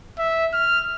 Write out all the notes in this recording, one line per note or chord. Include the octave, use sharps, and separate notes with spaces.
E5
F6